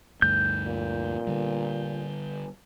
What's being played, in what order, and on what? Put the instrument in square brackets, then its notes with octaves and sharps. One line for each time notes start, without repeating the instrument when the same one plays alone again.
[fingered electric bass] D2 G2 A3 [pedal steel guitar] G6
[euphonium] A#2
[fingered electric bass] D3 G3